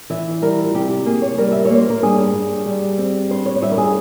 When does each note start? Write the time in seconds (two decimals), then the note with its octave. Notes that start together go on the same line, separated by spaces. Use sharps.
0.10 E3 E5
0.42 G3 A#4
0.64 F4
0.74 C3 G4
0.90 G4
1.06 A#3 G#4
1.22 C#5
1.38 G3 A#4
1.52 E5
1.65 C#5
1.70 A#3
1.77 C5
1.90 A#4
2.02 G2 G#4
2.34 G2
2.66 G3
2.98 C4
3.30 G2 C5
3.46 C#5
3.56 C#5
3.62 G2 E5
3.72 A#4
3.78 G#4